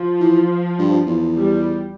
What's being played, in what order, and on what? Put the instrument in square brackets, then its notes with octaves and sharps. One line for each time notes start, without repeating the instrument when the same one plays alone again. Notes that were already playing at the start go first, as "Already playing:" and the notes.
Already playing: [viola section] F3
[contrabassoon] E3
G2
E2
[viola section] G3